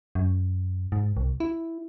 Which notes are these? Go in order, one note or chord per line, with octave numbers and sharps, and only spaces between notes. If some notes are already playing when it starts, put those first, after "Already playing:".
F#2
G#2
C2
E4